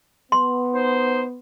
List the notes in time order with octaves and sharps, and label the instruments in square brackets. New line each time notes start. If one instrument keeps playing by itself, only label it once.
[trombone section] B3 [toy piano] C6
[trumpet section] D#4 C5